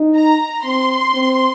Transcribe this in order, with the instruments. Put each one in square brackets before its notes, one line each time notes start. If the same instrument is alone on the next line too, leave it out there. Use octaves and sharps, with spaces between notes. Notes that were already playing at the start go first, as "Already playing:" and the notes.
Already playing: [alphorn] D#4
[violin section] A#5
[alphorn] C4 [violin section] C6
[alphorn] C4